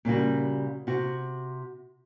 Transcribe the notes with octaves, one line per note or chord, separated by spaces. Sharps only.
A#2 C#3 G3 F#4
C3 F#4